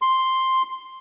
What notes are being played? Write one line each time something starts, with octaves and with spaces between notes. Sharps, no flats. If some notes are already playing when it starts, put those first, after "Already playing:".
C6